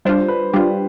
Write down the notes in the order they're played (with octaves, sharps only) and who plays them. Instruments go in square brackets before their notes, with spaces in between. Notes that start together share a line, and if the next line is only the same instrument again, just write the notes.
[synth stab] G3 D4 F4 [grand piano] C5
[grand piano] B4
[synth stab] G3 D4 F4 [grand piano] G4